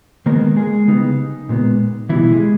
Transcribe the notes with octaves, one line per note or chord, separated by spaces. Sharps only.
D#3 G#3 A#3 B3 A#4
G#3 G#4
C#3 G3 B3 D#4
A#2 G#3 B3
B2 E3 G3 B3 E4
G#3 G#4